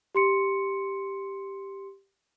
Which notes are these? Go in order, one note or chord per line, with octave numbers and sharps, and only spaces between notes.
G4 C6 C#7